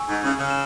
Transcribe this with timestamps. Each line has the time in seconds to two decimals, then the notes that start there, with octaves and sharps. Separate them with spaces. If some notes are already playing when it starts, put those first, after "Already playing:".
Already playing: G#5 C#6 E6
0.08 G#2
0.22 C#3
0.37 C#3
0.50 E7